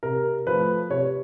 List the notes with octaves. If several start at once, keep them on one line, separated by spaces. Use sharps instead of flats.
C3 A#4
F3 A3 B4
C3 C#5